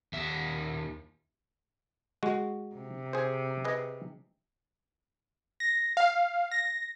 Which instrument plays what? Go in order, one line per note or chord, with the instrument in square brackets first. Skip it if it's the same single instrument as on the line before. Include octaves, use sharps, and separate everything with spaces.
[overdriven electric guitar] D#2 E5
[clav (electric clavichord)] G#3 F#4
[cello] C3
[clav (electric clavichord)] G#4 C5
G#4 B4 D#5
[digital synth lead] A#6
F5
A#6